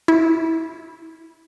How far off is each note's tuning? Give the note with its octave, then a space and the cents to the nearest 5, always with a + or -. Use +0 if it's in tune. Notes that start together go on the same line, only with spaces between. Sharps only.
E4 -15